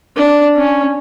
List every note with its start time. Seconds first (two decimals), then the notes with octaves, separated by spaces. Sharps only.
0.16 D4
0.56 C#4